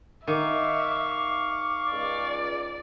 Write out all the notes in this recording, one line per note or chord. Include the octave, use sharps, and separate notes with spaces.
D#3 E5 F5 C#6 D6
C#2 D5